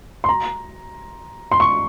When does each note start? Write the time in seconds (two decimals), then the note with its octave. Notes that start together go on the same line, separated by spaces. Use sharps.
0.24 C6
0.29 A#5
1.52 C6
1.60 C#6